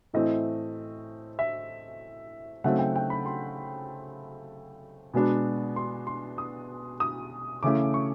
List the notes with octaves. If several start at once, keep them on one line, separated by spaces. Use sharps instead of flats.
A2 E3 A3 C4 D#5
E5
C#3 F#3 A3 C4 D#4 F#5
G5
G5
B5
C6
B2 G#3 B3 D4
C6
C6
D#6
D#6
C#3 E3 A3 C#4 D6
C#6